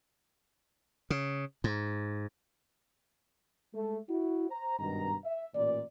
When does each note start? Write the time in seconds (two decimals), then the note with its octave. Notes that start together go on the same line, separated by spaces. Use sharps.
1.10 C#3
1.64 G#2
3.73 G#3 A3 A4
4.09 E4 F#4
4.49 C5 A#5
4.79 G#1 G2 B2 D#3 A#5
5.25 E5
5.54 A1 A#2 D5